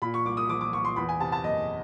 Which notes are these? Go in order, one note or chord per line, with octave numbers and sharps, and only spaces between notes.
A#2 B5
C#6
C2 D6
D#6
F3 D6
D6
C2 C#6
C6
E2 B5
G#5
C3 A5
A5
F#1 D#5